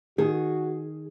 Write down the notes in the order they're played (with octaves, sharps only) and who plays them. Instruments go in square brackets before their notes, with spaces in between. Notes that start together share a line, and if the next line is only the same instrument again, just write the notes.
[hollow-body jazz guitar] D#3 [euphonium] F#4 [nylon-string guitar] G#4